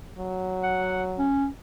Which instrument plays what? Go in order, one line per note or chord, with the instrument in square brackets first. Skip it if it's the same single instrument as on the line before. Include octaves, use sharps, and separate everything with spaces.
[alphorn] F#3
[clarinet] F#5
C#4